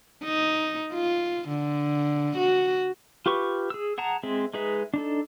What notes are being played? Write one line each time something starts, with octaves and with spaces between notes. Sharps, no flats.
D#4
F4
D3
F#4
F4 G4 B4 C#6
G#4 E6
G#4 F#5 A5 A#5
G#3 C4 G#4 E5
G#3 D#4 G#4 B4 E5
D4 D#4 A4